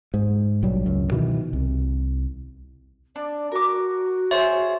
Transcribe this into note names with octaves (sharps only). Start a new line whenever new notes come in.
G#2
A#1 B2 F#3 G3
C#2 F#2
B2 D#3 E3
C2
D4 D5
F#4 A#4 D6
G#4 C5 C#5 E5